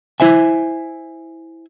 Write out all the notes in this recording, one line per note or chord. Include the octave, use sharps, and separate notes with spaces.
E4 C5 E5 G#5